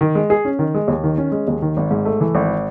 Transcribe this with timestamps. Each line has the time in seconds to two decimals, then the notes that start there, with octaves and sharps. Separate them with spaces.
0.01 D#3
0.15 G#3
0.30 G#4
0.45 C#4
0.59 D#3
0.74 G#3
0.88 D#2
1.04 D#3
1.18 C#4
1.32 G#3
1.48 D#2
1.62 D#3
1.77 G#1
1.91 G#2
2.05 A3
2.21 E3
2.35 G#1